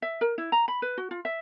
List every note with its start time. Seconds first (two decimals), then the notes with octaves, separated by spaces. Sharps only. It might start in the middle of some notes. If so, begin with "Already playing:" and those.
0.02 E5
0.21 A#4
0.38 E4
0.52 A#5
0.68 B5
0.82 B4
0.98 F#4
1.11 F4
1.25 E5